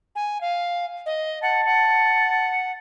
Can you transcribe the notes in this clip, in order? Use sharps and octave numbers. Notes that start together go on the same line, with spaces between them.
G#5
F5
D#5
F#5 A5
F#5